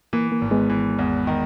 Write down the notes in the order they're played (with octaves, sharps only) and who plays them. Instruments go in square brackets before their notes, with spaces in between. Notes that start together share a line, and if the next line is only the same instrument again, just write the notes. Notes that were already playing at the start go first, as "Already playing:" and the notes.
[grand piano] E3 [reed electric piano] A#3
[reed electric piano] A#3
[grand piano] G#1
[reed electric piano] G#3 B3
[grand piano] E3
E2
D#3